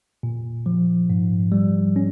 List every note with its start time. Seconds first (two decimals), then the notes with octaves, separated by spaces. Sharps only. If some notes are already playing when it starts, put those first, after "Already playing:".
0.23 A#2
0.66 F3
1.10 G#2
1.52 G3
1.96 C#4